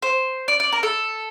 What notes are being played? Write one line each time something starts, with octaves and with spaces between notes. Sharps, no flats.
C5
D5
D5
A#4
A4